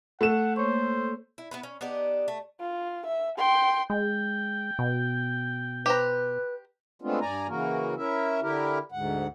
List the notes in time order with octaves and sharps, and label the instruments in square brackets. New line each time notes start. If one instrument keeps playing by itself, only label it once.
[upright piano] A3 E7 [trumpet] F#5
[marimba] A#3 C#5 C#6 [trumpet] C5
[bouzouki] E4
B3 E4 B4
C#4
B3 D4 D#4 G4
A3
[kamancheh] F4
E5
G5 C6
[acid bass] G#3 [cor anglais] G5
[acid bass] B2
[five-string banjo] G4 C5 A#5 [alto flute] B4
[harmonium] G#3 A3 B3 C4 D4 F4
G2 D5 G#5 A#5
C#3 E3 A#3 F#4 A#4
C#4 E4 A#4 E5
D3 E4 G4 A#4
D2 G#2 F#5